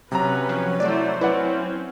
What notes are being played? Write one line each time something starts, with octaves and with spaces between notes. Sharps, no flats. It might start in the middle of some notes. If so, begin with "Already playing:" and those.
C3 F#3 C#4 B4 A#5
F3
A3 E4 C5 D5
C4 C#4 E4 B4 D5 F#5